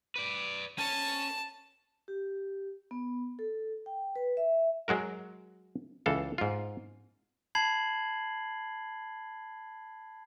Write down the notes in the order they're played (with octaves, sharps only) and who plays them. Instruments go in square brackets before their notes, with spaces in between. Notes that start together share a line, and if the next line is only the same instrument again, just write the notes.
[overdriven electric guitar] B4 D5
[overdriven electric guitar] C#4 [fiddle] A5
[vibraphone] G4
B3
A4
G5
B4
E5
[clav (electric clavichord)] F#3 G#3 F#4 A#4
C#2 E3 A4 F5
G#2 F4
[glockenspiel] A5 B5 G#6 C7 F#7